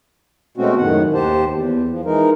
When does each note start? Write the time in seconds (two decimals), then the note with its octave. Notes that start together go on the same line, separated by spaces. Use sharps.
0.57 B2 G#3 A3 C4 C#4 F#4
0.77 F#2 A2 D#3 F#5
1.14 D#2 G4 C5 A5
1.51 E2
1.89 F3
2.05 E3 G#3 D#4 A#4